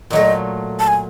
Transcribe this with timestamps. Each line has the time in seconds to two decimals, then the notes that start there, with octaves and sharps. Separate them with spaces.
0.10 A#2 F#3 A3 D#5
0.80 A5
0.88 G#5